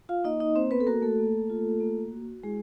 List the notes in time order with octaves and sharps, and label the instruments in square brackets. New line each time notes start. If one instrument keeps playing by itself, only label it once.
[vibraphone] F4 F5
A#3 D#4 D#5
D#4 D#5
C4 C5
B3 B4
A4
A#3 F#4 A#4
A3 A4
A#3
F4
A#3
F#4
G#3 E4 G#4